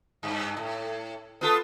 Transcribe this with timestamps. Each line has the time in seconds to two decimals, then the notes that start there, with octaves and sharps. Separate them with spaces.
0.23 G2
0.57 A2
1.41 B3 F4 A4